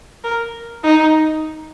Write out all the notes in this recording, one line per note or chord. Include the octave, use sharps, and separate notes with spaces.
A#4
D#4